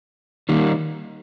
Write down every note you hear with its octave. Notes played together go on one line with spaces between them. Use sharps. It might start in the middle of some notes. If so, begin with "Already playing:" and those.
D#3 G3 A#3